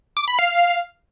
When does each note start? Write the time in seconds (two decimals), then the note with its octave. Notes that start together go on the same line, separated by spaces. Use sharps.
0.17 D6
0.28 B5
0.39 F5